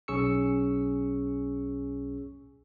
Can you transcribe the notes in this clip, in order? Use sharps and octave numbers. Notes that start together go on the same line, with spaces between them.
B1 C#4 G#4 C#6 E6 C#7